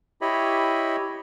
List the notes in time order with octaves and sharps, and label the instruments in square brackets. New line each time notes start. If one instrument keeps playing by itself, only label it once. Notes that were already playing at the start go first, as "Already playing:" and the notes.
[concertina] E4 G4 C#5 D#5 B5